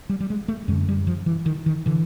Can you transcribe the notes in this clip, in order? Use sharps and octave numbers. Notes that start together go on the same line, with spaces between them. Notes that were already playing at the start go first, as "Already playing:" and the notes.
G3
G3
G#3
A3
F#2 D3 G#3
G3
F3
E3
D#3
D#3
D3 E3